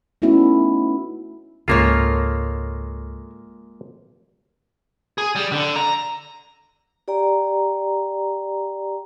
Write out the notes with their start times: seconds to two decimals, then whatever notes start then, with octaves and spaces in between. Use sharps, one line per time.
0.22 A3 B3 C#4 D#4 E4 F#4
1.68 C#2 G#2 G#3 A#3 F4 A4 A#4 C#5
5.18 G#4
5.35 G3
5.52 D3
5.76 A#5
7.08 G4 D5 G5 A#5